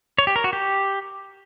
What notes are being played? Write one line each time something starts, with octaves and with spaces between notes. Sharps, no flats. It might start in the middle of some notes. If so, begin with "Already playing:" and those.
C#5
G4
A#4
F#4
G4